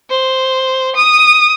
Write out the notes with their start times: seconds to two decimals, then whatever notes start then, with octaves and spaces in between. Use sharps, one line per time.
0.10 C5
0.96 D#6